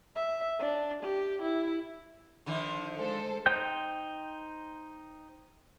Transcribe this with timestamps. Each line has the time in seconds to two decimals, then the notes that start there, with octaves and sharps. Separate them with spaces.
0.15 E5
0.59 D4
1.03 G4
1.42 E4
2.46 D3 D#3 F3
2.95 G#3 A4 C5
3.46 D#4 C5 G5 G6